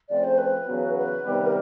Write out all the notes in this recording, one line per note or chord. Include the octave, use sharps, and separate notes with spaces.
C#3 F3 A3 C4 D5
C5
B4
E2 C#3 F#3 B3
B4
C3 D#3 G3 B3
A#4